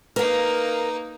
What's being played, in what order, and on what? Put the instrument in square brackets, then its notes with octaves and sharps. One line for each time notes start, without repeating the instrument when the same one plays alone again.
[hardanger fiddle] A#3 D#4 [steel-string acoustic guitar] A#4 F5 [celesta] B4